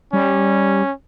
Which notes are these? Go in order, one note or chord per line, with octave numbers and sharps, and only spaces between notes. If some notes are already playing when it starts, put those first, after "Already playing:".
G3 C#4